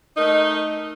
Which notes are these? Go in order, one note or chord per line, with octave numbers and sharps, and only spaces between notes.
A3 D#4 A#4 D#5